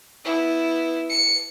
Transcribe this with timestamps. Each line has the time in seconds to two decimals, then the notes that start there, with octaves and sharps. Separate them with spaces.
0.24 B3 E4
1.10 C#7